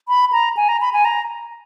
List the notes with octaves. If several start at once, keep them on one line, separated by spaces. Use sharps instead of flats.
B5
A#5
G#5
A#5
B5
G#5
A#5